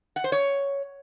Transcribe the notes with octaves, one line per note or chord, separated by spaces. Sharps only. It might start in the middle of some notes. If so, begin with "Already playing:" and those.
F#5
C5
C#5